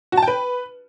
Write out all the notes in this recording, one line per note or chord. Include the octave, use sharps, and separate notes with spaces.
F#4
A5
G5
B4